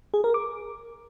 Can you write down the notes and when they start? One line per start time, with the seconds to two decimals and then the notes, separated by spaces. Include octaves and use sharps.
0.14 G#4
0.24 A#4
0.34 D6